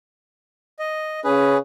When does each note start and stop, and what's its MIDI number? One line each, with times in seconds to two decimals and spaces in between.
0.79 1.20 75
1.24 1.55 49
1.24 1.55 61
1.24 1.57 68
1.24 1.57 71